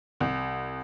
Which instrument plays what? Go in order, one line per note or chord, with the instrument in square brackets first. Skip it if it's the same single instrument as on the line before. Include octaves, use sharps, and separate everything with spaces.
[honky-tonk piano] C2